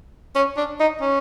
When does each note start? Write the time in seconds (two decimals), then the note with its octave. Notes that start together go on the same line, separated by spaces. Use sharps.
0.36 C#4
0.57 D4
0.80 D#4
1.01 C#4